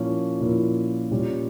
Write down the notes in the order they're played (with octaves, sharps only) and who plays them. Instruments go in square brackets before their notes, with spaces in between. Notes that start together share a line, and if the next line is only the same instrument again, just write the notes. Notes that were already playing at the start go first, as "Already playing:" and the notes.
Already playing: [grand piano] A#2 F3 A#3 C#4 E4
A#2 F3 A#3 C#4 E4
A#2 G3 C#4